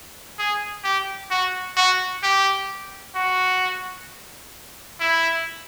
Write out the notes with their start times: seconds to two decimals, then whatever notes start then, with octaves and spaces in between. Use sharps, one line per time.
0.39 G#4
0.84 G4
1.31 F#4
1.77 F#4
2.23 G4
3.15 F#4
5.00 E4